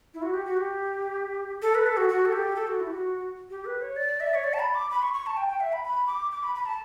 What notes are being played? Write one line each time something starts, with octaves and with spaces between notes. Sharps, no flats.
E4
F#4
G4
F#4
G4
A4
B4
A4
F#4
F#4
A4
G4
A4
F#4
E4
G4
F#4
G4
B4
C#5
D5
E5
C#5
D5
A5
B5
D6
B5
C#6
C#6
A5
G5
G5
E5
B5
B5
D6
D6
B5
B5
A5